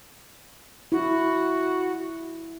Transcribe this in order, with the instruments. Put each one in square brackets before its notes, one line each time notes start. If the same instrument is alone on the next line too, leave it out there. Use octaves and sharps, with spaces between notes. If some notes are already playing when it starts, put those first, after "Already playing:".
[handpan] E4 [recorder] F#4